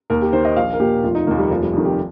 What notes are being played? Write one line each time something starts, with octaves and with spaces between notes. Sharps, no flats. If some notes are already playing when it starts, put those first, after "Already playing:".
D#2 A#4
G4
D#3 C5
D#5
A#1 F5
A#4
A#2 G4
F1 F4
D#4
D#2 D#3 A#3
G3
F1 F3
G3
F2 D#3
G4